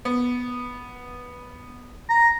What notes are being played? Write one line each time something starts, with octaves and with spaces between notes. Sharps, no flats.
B3
A#5